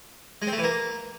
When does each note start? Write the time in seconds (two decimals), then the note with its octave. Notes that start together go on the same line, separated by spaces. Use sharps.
0.42 G#3
0.47 C4
0.53 A3
0.58 E3
0.64 A#3